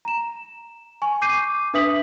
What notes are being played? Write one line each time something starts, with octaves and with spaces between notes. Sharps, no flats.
A#5 E7
G#5 C#6
D6 G6 C7 D#7
D4 B4 E5 D#6 B6 F#7